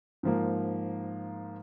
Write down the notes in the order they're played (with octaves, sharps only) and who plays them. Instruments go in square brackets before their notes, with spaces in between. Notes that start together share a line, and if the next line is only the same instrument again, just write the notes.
[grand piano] G#2 F3 A#3